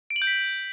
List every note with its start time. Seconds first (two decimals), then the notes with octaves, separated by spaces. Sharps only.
0.10 D7
0.16 F#7
0.22 G6
0.27 B6